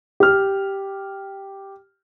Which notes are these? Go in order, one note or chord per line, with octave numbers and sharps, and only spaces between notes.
G4 F6